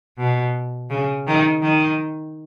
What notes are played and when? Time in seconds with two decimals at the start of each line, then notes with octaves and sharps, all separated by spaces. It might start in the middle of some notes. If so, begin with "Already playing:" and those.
0.18 B2
0.90 C#3
1.27 D#3
1.62 D#3